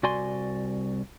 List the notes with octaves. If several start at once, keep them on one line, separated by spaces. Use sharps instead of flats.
C2 F#4 D5 G#5 C6